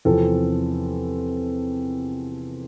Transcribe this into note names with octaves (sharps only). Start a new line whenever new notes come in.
E2 C3 F3 C4 A4